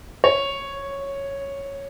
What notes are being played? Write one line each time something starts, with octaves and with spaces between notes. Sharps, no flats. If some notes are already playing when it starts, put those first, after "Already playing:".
C#5